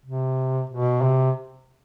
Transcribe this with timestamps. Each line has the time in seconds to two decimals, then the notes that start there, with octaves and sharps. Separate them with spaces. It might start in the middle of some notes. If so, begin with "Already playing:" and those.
0.06 C3
0.70 B2
1.02 C3